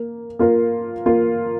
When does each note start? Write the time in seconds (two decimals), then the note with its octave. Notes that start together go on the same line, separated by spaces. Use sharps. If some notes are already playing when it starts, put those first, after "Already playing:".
Already playing: A#3 A#4
0.39 A#3 F4 A#4
1.06 A#3 F4 A#4